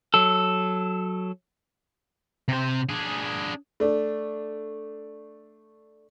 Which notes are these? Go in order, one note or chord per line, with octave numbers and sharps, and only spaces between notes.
F#3 A4
C3 C5
D4 G#4
A3 D4